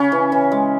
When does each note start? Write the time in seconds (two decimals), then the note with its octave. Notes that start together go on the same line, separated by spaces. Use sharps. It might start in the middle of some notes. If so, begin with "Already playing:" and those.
Already playing: C#3 C#4
0.12 E3
0.32 E3
0.52 G#3